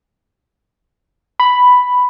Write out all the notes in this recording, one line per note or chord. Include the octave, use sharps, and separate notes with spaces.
B5